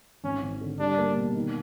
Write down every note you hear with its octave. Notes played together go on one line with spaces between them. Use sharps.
G#1 C#4
G#1
D3
G3 D4
A#3
B2
D#3